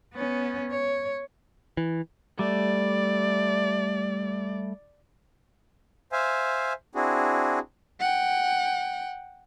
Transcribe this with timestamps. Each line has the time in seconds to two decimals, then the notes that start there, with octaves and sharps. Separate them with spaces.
0.14 B3 C#4
0.71 C#5
1.77 E3
2.39 G3 A3 D5
6.12 C5 E5 F5 G#5
6.95 C4 D4 E4 F#4 G#4
8.00 F#5 G5